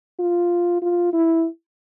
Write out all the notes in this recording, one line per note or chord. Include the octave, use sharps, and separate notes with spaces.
F4
F4
E4